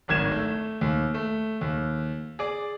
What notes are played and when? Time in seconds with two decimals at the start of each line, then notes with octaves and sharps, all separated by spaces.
0.08 D1 G#1 D#3 G#6 E7
0.32 A3
0.81 D#2
1.14 A3
1.61 D#2
2.39 G#4 D5